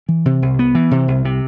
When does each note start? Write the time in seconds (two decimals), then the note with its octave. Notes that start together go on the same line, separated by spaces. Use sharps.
0.09 E3
0.26 C3
0.42 C2
0.59 B3
0.75 E3
0.91 C3
1.08 C2
1.25 C3